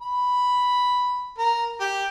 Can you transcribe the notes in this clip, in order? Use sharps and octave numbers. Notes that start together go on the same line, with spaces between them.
B5
A#4
G4